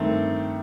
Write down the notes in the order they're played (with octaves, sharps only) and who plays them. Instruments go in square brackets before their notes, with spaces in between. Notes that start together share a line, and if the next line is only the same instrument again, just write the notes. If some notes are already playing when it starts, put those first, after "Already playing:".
Already playing: [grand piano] G2 D#3 A3 [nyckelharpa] C4